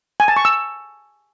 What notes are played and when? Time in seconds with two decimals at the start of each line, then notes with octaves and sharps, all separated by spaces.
0.20 G#5
0.28 A5
0.37 C#6
0.45 E6